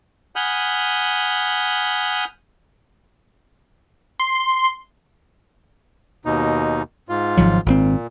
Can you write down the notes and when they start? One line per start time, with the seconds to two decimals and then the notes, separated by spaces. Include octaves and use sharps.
0.36 F#5 G#5 B5 D#6 F6 G6
4.20 C6
6.25 D#2 B2 D#4
7.09 G#2 F4
7.37 G#1 F3 F#3
7.66 G#1 A#2 D3 C4